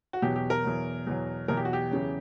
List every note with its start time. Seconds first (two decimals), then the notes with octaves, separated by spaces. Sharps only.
0.13 F#4
0.22 E2 B2 F#3 G4
0.36 G4
0.50 A#4
0.64 E2 B2 F#3
1.07 E2 B2 F#3
1.48 E2 B2 F#3 A#4
1.57 G4
1.65 F#4
1.73 G4
1.91 E2 C#3 F#3